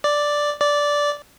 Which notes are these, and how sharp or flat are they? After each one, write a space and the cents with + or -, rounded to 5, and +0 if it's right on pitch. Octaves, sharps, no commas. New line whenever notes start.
D5 +0
D5 -10